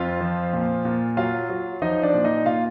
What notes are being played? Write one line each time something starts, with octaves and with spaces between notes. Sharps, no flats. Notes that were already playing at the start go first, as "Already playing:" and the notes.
Already playing: F2 F4 F5
F3
A#2
A#2
F#3 F4 F5
F#3
F3 D#4 D#5
D4 D5
A#2
D#4 D#5
A#2 F4 F5